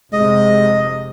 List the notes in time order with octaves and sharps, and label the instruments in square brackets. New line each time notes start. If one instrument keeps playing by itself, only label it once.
[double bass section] F1 C3 [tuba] G#3 [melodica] D#5